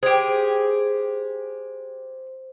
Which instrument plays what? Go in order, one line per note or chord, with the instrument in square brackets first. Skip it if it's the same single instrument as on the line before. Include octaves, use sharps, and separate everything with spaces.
[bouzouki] G4 G#4 [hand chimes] C5